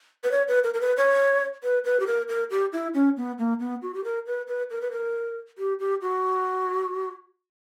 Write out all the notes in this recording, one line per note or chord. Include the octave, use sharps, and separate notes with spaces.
B4
C#5
B4
A#4
A#4
B4
C#5
B4
B4
G4
A#4
A#4
G4
E4
C#4
B3
A#3
B3
F#4
G4
A#4
B4
B4
A#4
B4
A#4
G4
G4
F#4